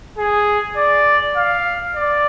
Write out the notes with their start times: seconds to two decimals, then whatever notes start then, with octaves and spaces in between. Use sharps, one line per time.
0.18 G#4
0.77 D5
1.36 F5
1.96 D5